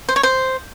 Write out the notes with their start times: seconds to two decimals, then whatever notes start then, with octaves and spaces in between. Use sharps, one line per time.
0.09 C5
0.16 C#5
0.23 C5